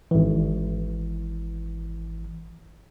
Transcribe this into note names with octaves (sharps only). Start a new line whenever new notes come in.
G#1 E3